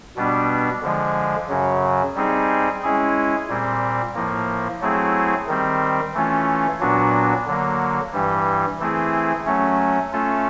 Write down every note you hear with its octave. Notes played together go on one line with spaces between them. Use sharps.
B2 G3 B3 D4
D3 F3 G#3
F#2 C#3 F#3
G3 C4 D#4 G#4
G#3 C#4 E4 G#4
A#2 G3 C4
A2 F3 A#3
F#3 A3 C4 E4 G#4
D#3 G3 C4
E3 A3 C#4 F4
A#2 F#3 B3 D4 F#4
D3 F#3 A#3
G2 E3 G3
E3 A3 C4 E4 G#4
F#3 A3 C#4
A3 C#4 F4 A4